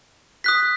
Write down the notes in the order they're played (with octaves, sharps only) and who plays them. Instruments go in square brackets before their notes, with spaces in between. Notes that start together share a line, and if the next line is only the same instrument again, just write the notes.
[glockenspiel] D#6 F#6 B6